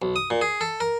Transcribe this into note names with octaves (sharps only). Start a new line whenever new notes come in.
B1
D#6
A#2
G#4
A4
A#4